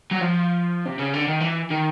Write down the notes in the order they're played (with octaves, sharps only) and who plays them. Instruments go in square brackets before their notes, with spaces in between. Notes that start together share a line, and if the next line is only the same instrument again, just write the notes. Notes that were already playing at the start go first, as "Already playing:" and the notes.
[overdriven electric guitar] F#3
F3
C3
C#3
D3
D#3
E3
D#3